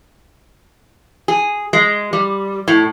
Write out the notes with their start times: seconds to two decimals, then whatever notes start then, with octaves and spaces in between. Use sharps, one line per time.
1.28 G#4
1.73 G#3
2.13 G3
2.68 A2